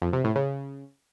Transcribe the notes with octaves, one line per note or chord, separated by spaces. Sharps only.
F2
C3
A2
C#3